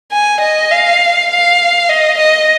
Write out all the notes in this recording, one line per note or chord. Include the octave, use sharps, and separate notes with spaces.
G#5
D#5
F5
F5
D#5
D#5